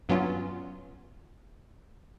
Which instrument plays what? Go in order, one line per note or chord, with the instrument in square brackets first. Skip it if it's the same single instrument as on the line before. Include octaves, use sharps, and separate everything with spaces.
[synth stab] G2 F#3 B3 C#4 F4